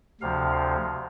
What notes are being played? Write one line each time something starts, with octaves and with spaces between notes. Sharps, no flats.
D2 C3 F3 F5